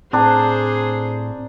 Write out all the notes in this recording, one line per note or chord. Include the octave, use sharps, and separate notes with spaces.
A2 C4 D4 G#4 C5 A#5